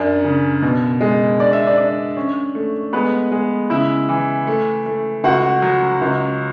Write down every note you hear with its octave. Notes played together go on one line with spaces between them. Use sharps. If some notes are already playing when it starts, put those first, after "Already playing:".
Already playing: F#2 D4 D5
C#3
B2
G#3
D4 D5
E5
D4 D5
D4
C#4
A3
G#3 B3 B4
G#3
C#3 E4 E5
E3
A3
A3
C#2 F#4 F#5
F#3
C#2